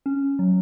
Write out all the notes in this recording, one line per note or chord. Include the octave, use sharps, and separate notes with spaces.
C#4
F#3